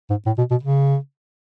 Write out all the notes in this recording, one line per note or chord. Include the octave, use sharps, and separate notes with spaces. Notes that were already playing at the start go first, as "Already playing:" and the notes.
G#2
A2
B2
B2
C#3